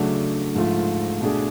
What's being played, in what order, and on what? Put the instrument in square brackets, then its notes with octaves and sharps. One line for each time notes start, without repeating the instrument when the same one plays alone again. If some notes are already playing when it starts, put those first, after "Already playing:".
Already playing: [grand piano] C#3 F#3 A3 D4
G#2 F3 A3 F4
B2 A3 D4 G#4